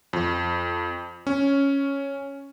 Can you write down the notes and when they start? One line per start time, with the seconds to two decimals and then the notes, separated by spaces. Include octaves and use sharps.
0.13 F2
1.27 C#4